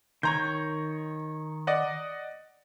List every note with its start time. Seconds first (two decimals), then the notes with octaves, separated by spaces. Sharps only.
0.23 D#3 C#5 A#5 C6 G6
1.67 D5 D#5 F#5